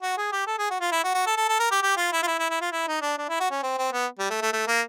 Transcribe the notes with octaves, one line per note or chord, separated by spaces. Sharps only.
F#4
G#4
G4
A4
G#4
F#4
F4
E4
F#4
F#4
A4
A4
A4
A#4
G4
G4
F4
E4
F4
E4
E4
E4
F4
E4
D#4
D4
D4
E4
F#4
C#4
C4
C4
B3
G3
A3
A3
A3
A#3